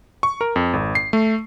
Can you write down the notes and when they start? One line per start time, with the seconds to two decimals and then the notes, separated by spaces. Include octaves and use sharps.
0.23 C#6
0.41 A#4
0.56 F2
0.73 G#1
0.95 C7
1.13 A3